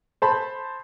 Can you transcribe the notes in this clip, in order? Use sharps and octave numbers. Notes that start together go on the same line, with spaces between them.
C5 A5 B5